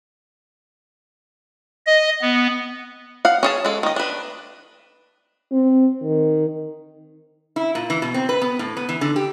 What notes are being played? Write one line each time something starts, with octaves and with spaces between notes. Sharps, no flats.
D#5
B3
F5 F#5
C#4 G#4 A5
G#3 A4
D#3 D#5
D4 B4
C4
D#3
E4
A#2
E3
B2
C4
B4
B3
A2
B3
E3
D3
G4